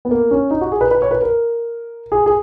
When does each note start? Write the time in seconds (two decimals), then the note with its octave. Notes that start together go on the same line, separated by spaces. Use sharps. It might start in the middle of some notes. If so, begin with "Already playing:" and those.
0.05 B3
0.11 A#3
0.31 C#4
0.51 D#4
0.61 F#4
0.72 G#4
0.81 B4
0.91 B4
1.02 C#5
1.11 B4
1.22 A#4
2.12 G#4
2.26 G#4